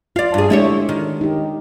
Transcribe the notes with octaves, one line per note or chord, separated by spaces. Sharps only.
F4 D5 F5
G2 G#4
G#3 A3 D4 E4 G4 C#5
D#3
D#4 G4